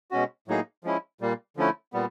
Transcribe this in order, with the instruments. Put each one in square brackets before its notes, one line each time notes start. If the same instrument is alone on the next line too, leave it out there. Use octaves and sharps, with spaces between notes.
[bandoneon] B2 G#3 C#4 F#4
A2 F#3 A#3 D#4 G#4
F3 G#3 C#4 E4
A#2 G3 A#3
D3 F3 A3 C#4 E4
A#2 G3 B3